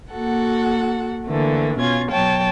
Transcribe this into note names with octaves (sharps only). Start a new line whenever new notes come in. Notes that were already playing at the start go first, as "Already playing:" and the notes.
A#3 F#4 A4 F#5
D3 E3 A3 A#3
B2 C#4 F4 G#6
B2 F#3 C#5 G5 A5